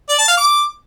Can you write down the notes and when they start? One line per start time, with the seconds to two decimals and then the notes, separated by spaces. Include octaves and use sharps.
0.09 D5
0.18 A5
0.28 F5
0.37 D6